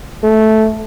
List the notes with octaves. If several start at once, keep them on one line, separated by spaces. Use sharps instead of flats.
A3